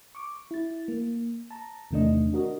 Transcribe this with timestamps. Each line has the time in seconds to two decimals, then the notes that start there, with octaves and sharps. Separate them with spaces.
0.15 C#6 D6
0.51 E4 A6
0.88 A#3
1.51 A5 A#5
1.91 E2 C3 D#3 A3 D4 D#5
2.33 D4 F#4 A#4 D#5